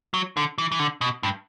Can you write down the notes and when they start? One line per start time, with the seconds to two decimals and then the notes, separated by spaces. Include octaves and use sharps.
0.14 F#3
0.37 D3
0.58 E3
0.72 E3
0.79 D3
1.01 B2
1.23 G2